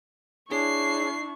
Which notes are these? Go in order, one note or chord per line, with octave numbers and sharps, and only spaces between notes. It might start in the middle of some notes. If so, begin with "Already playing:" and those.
D4 E4 G#4 C#5 C#6 C7